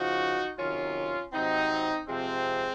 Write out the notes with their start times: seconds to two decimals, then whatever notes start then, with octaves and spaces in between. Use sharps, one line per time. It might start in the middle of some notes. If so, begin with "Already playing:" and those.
Already playing: C#3 F3 D#4 F#4
0.58 C3 D#3 F#3 C#4 F4
1.33 C3 F#3 C4 D#4
2.08 C3 F3 G#3 C4